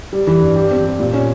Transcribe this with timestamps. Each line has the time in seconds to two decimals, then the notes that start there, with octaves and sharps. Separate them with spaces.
0.13 G3
0.27 E3
0.41 G2
0.56 G4
0.71 C4
0.85 G3
1.00 A#2
1.13 C#4